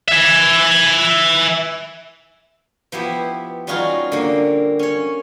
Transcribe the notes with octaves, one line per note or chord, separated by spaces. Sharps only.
E5 G#5
F3 B3 E4 G4
G3 C#4 D#4 F4 F#4 G#4
D3 A#3
C#4 C#5